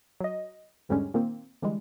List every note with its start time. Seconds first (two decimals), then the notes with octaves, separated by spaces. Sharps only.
0.21 F#3 D#5
0.89 E2 G#2 D3 G3 G#3 C#4
1.14 A#2 D#3 A#3 C4
1.63 D3 E3 G3 G#3